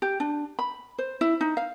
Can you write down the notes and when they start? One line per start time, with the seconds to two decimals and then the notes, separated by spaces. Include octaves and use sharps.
0.02 G4
0.20 D4
0.59 B5
0.98 C5
1.21 E4
1.41 D#4
1.57 F5